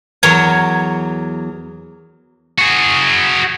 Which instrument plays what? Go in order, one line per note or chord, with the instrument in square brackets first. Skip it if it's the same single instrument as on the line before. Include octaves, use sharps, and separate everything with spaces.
[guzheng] E2 F#3 A#4 C#5 G#5
[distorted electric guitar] F#4 G#4